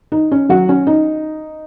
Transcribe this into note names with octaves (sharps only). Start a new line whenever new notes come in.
D#4
C#4
F#3 F#4
C#4
D#4